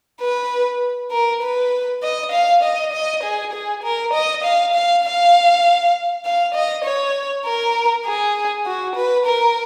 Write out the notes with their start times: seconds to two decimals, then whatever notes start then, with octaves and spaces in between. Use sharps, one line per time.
0.22 B4
1.12 A#4
1.43 B4
2.03 D#5
2.32 F5
2.63 D#5
2.93 D#5
3.24 G#4
3.53 G#4
3.84 A#4
4.14 D#5
4.44 F5
4.75 F5
5.04 F5
6.25 F5
6.55 D#5
6.85 C#5
7.46 A#4
8.06 G#4
8.66 F#4
8.96 B4
9.26 A#4